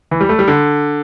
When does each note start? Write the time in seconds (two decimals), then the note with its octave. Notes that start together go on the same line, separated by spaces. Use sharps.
0.11 E3
0.21 G3
0.29 A3
0.39 G3
0.48 D3